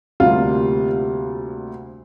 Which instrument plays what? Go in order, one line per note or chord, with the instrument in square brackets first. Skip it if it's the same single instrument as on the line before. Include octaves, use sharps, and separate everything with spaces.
[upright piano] D2 C3 G3 A#3 F4